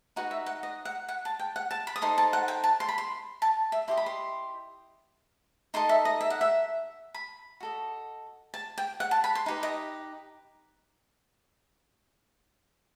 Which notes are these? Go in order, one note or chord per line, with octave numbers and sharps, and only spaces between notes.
D#4 F#4 B4 F#5
E5
F#5
D#5
F#5
F#5
A5
G5
F#5
A5
B5
D#6
D#4 A4 C5 C6
A5
F#5
G5
A5
C6
B5
C6
A5
E5
E4 G4 D#5 C6
B5
C6
D#4 A4 D#5 C6
E5
D#5
E5
F#5
E5
B5
F#4 A4 D#5
A5
G5
F#5
A5
B5
C6
D#4 G4 B4
D#5